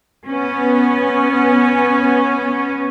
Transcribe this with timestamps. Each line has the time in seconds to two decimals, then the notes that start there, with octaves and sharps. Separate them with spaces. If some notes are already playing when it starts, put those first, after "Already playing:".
0.26 B3 C#4